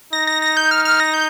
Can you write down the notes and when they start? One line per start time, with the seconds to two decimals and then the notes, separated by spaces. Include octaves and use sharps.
0.13 D#4 A#6
0.27 A#6
0.42 A#6
0.57 G6
0.71 F6
0.85 F6
1.00 A#6
1.14 G6